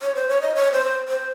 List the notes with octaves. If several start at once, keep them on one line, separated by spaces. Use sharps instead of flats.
C#5
C5
C#5
D#5
C#5
C5
C5